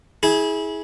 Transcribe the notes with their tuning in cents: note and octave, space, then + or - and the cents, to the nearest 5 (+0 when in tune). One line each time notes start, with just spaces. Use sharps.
E4 -25 G#4 +5